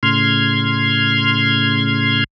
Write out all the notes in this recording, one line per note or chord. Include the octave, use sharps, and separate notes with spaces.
A2 C#3 C6 F6 G#6